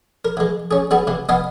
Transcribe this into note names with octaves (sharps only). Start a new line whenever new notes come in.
A#4
E3 G#3
C#4 G#4
G3 B3 G#4
C3 E3
B3 D#5 F5 G#5